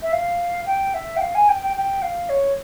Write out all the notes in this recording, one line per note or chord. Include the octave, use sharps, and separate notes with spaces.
E5
F5
G5
E5
G5
F5
G#5
G5
G5
G5
F5
C#5